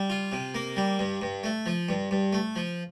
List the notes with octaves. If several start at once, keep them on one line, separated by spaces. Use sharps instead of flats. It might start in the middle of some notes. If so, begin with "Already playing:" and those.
Already playing: G3
F4
C3
A#3
G3
G2
G2
A3
F3
G2
G2
A3
F3